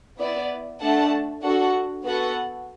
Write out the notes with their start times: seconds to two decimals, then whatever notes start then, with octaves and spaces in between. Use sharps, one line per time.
0.18 B3 E4 D5
0.80 A3 D4 A4 F#5 A5
1.42 D4 F#4 A4 F#5
2.04 B3 F#4 A4 F#5